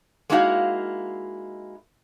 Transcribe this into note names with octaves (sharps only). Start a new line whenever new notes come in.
G#3 A#3 D#4 E4 F#4 F5